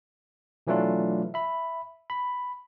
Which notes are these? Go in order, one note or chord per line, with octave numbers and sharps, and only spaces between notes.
B2 E3 F#3 A3 D4 F4
E5 B5
B5